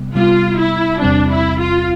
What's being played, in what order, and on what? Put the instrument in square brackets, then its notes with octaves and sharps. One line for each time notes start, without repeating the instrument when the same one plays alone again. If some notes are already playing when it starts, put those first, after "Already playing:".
Already playing: [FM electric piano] C3 G3 B3
[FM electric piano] C3 G3 B3 [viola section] F4
[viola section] E4
[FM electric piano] E2 C3 G3 C4 [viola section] D4
[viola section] E4
F4